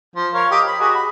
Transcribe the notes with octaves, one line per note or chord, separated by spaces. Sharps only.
F3
A#4 C#5 F5
G4 D#5 D6
B5
F#4 G#4 D#5
B5